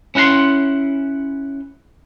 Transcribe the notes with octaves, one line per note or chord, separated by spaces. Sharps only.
C#4 E4 F#5 A#5 C6